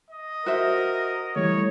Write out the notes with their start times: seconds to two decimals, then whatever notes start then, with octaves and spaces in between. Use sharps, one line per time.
0.11 D#5
0.46 F#4 A#4 C5 E5
1.36 E3 G3 A3 C#5